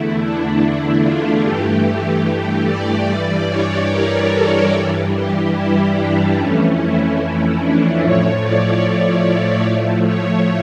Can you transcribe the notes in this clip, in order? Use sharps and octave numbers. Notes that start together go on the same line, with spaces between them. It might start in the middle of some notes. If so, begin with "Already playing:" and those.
Already playing: E2 D3 A3 E4
D4
E4
F4
G2 E3 A3 G4
D5
G2 E3 G3 D5
C#5
A#4
A4
G2 E3 G3
G4
E4
D4
F2 E3 A3 C#4
E4
C#4
D4
A2 F3 A3 C#5
D5
C#5
A2 F3 A3
C#5